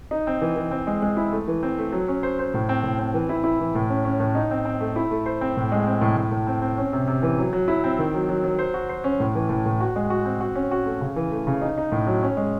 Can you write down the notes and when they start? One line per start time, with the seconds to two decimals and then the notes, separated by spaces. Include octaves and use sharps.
0.11 D#4
0.27 C4
0.41 E3
0.56 E3
0.71 C4
0.87 G#3
1.02 G#3
1.17 E4
1.32 A3
1.48 E3
1.63 C4
1.78 A3
1.92 F#3
2.08 C#4
2.23 C5
2.39 C5
2.54 A2
2.69 C4
2.83 A2
2.99 C4
3.14 E3
3.29 E4
3.44 E4
3.60 E3
3.75 A2
3.89 C#4
4.05 C#4
4.20 A2
4.35 D#4
4.51 C4
4.65 C4
4.80 A3
4.96 E4
5.11 A3
5.26 C5
5.41 C4
5.57 A2
5.72 G#3
5.87 C4
6.01 A2
6.16 A2
6.31 A2
6.47 C4
6.62 C4
6.78 C#4
6.93 C3
7.08 C3
7.23 E3
7.38 F#3
7.53 F#3
7.68 E4
7.84 C4
7.98 D#3
8.14 F#3
8.29 F#3
8.44 F#3
8.59 C5
8.74 F#4
8.89 C5
9.04 C#4
9.20 A2
9.35 E3
9.49 A2
9.66 A2
9.80 F#4
9.96 G#3
10.10 F#4
10.25 C4
10.40 F#4
10.55 C#4
10.71 F#4
10.86 A3
11.01 C#3
11.16 E3
11.32 A3
11.47 C#3
11.61 D#4
11.78 D#4
11.92 A2
12.07 F#3
12.23 C#4
12.37 G#3